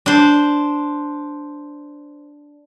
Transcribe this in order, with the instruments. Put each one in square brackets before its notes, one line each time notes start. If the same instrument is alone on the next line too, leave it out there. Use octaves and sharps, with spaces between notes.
[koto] D4 C5